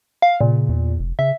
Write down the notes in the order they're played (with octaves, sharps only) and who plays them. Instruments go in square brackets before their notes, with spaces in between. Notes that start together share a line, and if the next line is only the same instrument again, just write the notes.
[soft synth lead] F5
[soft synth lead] A#2 [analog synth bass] C#3
[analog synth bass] E2
F1
[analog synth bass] C#3 [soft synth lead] E5